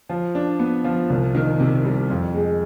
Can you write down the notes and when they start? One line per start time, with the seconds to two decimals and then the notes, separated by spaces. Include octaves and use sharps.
0.09 F3
0.35 D4
0.59 B3
0.84 F3
1.10 C2
1.35 D#3
1.60 C3
1.85 G3
2.10 F2
2.35 G#3